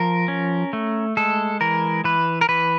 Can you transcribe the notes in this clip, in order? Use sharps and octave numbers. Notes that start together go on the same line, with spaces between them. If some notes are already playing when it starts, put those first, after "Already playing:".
Already playing: F3 A#4
C#4
A3
G#3 A4
E3 A#4
E3 B4
A#4
E3 B4